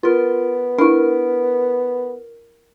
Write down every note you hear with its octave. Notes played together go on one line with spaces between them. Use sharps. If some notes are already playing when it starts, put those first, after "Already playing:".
B3 F4 A#4
D4 E4 A#4